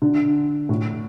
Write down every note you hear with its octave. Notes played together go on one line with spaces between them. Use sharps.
D3
A2